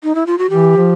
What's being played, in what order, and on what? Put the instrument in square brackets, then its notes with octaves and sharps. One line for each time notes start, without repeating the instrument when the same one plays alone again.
[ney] D#4
E4
F4
F#4
[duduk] E3 [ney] G4
[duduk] F3